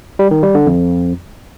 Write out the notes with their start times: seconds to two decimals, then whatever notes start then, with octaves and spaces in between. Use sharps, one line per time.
0.19 G3
0.31 D#3
0.43 G3
0.55 D3
0.66 F2